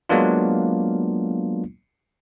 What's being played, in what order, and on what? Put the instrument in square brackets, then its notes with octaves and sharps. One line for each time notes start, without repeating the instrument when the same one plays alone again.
[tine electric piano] F#3 G#3 A#3 B3 D4 F4